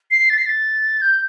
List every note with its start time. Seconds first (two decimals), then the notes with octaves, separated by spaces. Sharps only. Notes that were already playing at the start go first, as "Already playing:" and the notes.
0.11 C7
0.30 A6
0.38 C7
0.46 A6
1.02 G6